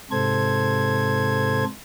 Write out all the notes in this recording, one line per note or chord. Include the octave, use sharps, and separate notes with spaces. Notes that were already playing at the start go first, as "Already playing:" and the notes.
G#2 C3 A4 C5 G#6